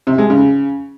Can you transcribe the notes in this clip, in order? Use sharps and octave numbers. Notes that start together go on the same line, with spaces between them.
C3
G#3
C#3